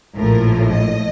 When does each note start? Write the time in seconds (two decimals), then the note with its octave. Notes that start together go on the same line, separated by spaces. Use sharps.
0.16 A#1 A2 F3 A#4
0.70 D#5